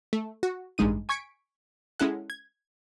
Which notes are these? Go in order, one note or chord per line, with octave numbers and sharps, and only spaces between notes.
A3
F#4
A1 G2 G#3 D#4 D#7
G#5 C#6 G#6 B6 C#7 D7
G#3 C#4 E4 A4 F#5
G#6